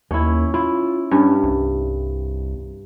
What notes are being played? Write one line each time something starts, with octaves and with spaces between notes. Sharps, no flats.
D#2 C#4 E4
E4 F4
G2 C#4
C2